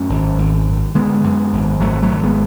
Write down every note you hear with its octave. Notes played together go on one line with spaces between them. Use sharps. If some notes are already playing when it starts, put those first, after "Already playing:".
Already playing: F#2 A3 C#4
G#1
G#1
F#2
D3 G#3 B3
F#2
G#1
G#1 F#3 A3
F#3 A3
G#1
G#3 B3